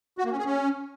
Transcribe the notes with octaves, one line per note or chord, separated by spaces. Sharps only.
F#4
A#3
C#4
G#4
C#4